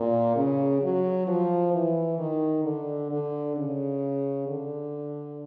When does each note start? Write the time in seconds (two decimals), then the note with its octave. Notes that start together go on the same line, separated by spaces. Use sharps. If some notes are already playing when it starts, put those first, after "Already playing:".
Already playing: A#2
0.36 C#3
0.82 F#3
1.27 F3
1.73 E3
2.18 D#3
2.64 D3
3.10 D3
3.56 C#3
4.47 D3